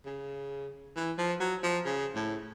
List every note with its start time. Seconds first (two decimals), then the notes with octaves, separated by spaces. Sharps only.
0.05 C#3
0.96 E3
1.18 F3
1.40 F#3
1.63 F3
1.85 C#3
2.15 A2